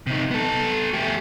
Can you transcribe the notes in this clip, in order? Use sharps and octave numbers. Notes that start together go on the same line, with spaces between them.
C3 D#4
B3 A4
A3 G4